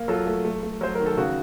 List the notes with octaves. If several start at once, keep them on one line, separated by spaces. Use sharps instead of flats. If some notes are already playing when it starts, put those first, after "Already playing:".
Already playing: A#3
F#3 F4 A4
A3
A3
A3
F#3 C5
D#3 A#4
A4
C#3 F#4